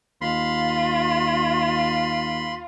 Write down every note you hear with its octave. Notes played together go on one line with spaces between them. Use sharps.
D#2 F4 B5 C6